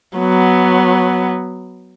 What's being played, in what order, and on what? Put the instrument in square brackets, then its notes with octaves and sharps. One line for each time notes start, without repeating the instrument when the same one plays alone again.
[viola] F#3 B3